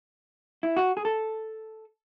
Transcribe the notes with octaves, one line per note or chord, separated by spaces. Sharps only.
E4
F#4
G#4
A4